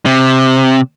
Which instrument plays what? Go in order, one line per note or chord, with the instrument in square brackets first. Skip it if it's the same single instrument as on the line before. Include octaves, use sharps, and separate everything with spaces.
[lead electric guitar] C3